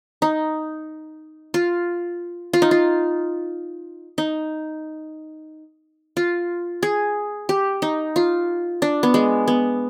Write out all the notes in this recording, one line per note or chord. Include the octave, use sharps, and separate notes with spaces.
D#4
F4
F4
D#4
F4
D#4
F4
G#4
G4
D#4
F4
D4
B3
G#3
B3